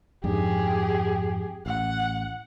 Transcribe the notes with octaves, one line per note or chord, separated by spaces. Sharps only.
F2 G#2 D4 G4 G#4
A1 F#5